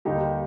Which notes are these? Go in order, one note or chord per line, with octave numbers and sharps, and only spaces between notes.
D#2 D3 G3 D#4 G4